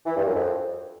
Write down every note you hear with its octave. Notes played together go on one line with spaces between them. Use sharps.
E3
G2
F#2
F2